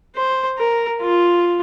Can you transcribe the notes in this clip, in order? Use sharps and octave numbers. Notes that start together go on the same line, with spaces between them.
C5
A#4
F4